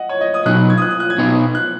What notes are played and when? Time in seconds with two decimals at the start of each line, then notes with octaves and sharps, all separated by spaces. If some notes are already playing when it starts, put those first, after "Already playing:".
Already playing: D#5 F#5
0.09 C#5
0.21 D#5
0.34 D#6
0.46 B2 F#3 D#4 F#6
0.70 G#6
0.78 D#6
0.82 F#6
0.91 D#6
1.00 F#6
1.10 G#6
1.18 B2 B3 D#4
1.55 F#6